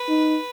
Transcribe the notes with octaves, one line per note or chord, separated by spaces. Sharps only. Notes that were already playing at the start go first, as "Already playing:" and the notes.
Already playing: B4
D#4